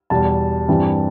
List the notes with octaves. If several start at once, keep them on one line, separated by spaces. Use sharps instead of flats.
E2 B2 G3 A5
G2 E3 G3 C4